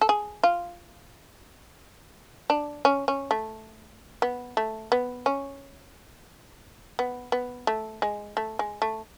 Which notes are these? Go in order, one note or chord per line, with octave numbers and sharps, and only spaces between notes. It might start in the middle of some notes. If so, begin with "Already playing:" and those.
A4
G#4
F4
D4
C#4
C#4
A3
B3
A3
B3
C#4
B3
B3
A3
G#3
A3
G#3
A3